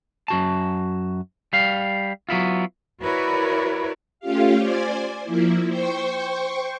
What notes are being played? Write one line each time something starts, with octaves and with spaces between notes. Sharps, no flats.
F#2 F#4 A5
G3 F5
F#3 B3 E4 F4
E4 F#4 A#4 B4 C#5 D5
A3 C#4 F4 G4 F5
C5 D5 G#5
F3 A#3 E4
C5 G5 C#6